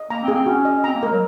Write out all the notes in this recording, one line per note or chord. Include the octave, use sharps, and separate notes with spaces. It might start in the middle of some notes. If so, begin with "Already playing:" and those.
Already playing: D#5
A#3 A#5
C4
A#3 G#4
C4
C#4 F#4
D#5
C4 A#5
A#3
G#3 A#4
F#3